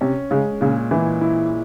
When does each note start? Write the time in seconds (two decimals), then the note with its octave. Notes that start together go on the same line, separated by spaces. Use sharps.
0.01 C3 C#4
0.31 C#3 G#3
0.61 A#2 C#3
0.91 A#2 E3
1.21 E4